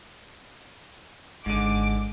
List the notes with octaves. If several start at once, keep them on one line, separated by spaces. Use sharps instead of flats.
G#1 G#2 D3 D6